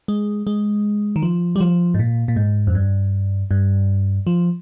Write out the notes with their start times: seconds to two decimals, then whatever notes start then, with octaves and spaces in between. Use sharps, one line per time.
0.08 G#3
0.47 G#3
1.16 D#3
1.23 F3
1.56 G3
1.60 F3
1.94 G#2
1.99 A#2
2.28 A#2
2.36 G#2
2.67 F2
2.75 G2
3.51 G2
4.27 F3